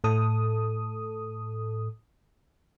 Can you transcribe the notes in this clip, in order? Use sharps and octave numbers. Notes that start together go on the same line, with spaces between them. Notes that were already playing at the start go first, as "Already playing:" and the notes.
A2 A4 D#6